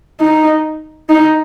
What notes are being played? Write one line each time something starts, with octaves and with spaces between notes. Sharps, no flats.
D#4
D#4